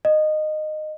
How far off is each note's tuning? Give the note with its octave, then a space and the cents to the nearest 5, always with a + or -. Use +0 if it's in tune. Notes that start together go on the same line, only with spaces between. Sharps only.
D#5 -15